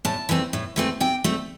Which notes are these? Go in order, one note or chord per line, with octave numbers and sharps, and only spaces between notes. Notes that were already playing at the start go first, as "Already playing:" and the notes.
A2 A5
E3 A3 C4
A2
E3 A3 C4
C3 G5
A3 C4